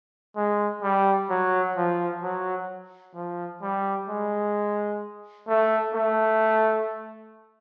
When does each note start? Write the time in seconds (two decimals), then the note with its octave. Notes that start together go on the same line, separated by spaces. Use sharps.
0.36 G#3
0.82 G3
1.30 F#3
1.76 F3
2.23 F#3
3.15 F3
3.62 G3
4.08 G#3
5.48 A3
5.94 A3